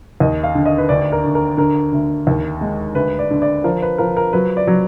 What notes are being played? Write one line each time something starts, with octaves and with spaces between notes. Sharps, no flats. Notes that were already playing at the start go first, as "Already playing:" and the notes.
D#2 D#5
F5
D3
D#5
B4
D2 D5
A#4
D3
A#4
D3 A#4
D2
D#2
G#3
D2 B4
D5
D3
D5
F3 A#4
B4
F3 A#4
A#4
F#3 B4
D5
F#3